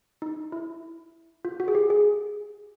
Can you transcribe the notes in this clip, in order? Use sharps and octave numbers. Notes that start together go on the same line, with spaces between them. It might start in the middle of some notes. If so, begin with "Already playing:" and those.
D#4
E4
F4
F#4
G#4
G4
G#4